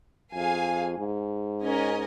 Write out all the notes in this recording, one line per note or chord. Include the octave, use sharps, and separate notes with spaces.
F2 G#4 F5 G#5
G#2
C#4 A#4 D#5 G#5